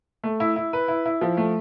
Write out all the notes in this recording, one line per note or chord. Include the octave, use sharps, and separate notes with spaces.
A3
E4
E4
B4
E4
E4
F3
A3